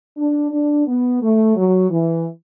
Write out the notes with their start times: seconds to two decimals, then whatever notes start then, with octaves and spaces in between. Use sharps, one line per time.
0.17 D4
0.51 D4
0.87 B3
1.21 A3
1.56 F#3
1.90 E3